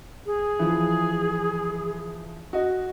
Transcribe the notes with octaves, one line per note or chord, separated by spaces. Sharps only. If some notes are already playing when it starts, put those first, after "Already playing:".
G#4
E3 F3
F#4 D#5